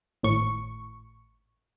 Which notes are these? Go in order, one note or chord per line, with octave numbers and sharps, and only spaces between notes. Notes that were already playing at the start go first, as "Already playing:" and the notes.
G#1 A2 C#6